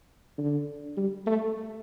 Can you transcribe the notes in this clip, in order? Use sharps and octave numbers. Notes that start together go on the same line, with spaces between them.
D3
G3
A3